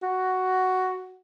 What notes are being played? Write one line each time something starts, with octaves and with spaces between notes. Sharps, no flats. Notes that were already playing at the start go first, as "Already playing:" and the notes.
F#4